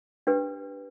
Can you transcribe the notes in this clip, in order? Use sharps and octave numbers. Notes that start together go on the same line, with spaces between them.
D4 G4 B4